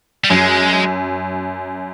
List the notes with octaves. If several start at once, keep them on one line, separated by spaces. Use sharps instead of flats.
G3
F#2 G#3